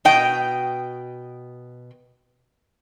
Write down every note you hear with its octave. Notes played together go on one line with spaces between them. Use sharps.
B2 D#5 G5